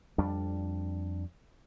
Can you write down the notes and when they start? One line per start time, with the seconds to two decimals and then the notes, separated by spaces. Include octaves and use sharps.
0.18 F2 G3 D4